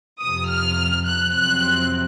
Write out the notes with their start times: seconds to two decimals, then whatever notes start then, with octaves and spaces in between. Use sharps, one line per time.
0.20 F2 C3 F3 D#6
0.48 F6
1.05 F#6
1.32 F2 C3 F#3 C4 F#6